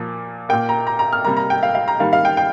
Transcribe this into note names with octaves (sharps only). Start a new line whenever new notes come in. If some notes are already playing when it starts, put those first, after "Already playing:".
Already playing: A#2 F3 A#3
A#2 A#3 G5
A#5
A#5
A#5
F6
C3 G3 A#3 A#5
A#5
G5
F5
F5
A#5
D#3 G3 A#3 F5
F5
G5
G5